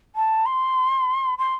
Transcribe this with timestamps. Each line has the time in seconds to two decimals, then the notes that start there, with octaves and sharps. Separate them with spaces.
0.15 A5
0.46 C6
1.38 C6